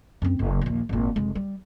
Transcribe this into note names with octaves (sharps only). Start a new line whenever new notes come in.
F#2 C4
F#1
A#1 D#2
G#1 A#2
F1 G#3
G3